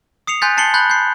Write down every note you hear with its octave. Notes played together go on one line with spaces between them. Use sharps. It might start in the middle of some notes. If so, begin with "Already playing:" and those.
D#6 C7 C#7 F7
G#5 C6 F#6 G6 A6 B6
A5 A6 C7 C#7 F#7 G7
B5 C6 F#6 G6 A6
G6 C7